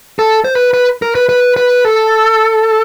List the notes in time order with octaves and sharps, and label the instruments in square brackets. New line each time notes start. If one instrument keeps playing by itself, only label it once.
[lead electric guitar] A4
C5
B4
B4
A#4
B4
B4
B4
A4